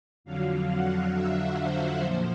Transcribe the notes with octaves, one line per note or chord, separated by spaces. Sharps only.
F2 D3 F#3 F5
F#5
E5
C5
A#2 F3 C5